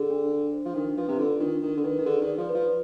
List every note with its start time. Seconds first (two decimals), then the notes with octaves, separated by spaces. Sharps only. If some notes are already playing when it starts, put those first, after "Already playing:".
Already playing: D3 G#4
0.10 D4
0.32 D4
0.53 C5
0.65 F3
0.75 D#3 D4
0.97 F3 B4
1.08 C3
1.18 D3 F4
1.40 D#3 D4
1.62 D#3 D4
1.77 D3
1.84 D#3 B4
1.99 D#3
2.05 D3 G#4
2.21 D#3
2.27 D5
2.38 F3
2.49 B4
2.54 F3